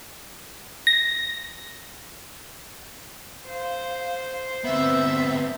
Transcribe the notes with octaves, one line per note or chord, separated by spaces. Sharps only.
A#6
C5 F5
D2 B3 C4 E5